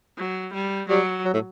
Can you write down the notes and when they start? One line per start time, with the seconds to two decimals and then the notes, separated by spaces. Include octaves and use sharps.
0.18 F#3
0.53 G3
0.89 F#3 G3
1.25 F#3
1.34 A2